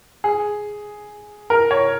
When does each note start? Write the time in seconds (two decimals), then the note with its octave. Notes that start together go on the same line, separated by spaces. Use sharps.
0.24 G#4
1.50 A#4
1.71 C#5